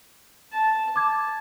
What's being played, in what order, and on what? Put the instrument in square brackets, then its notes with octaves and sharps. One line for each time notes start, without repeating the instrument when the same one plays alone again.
[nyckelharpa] A5
[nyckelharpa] A5 [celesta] D6 G#6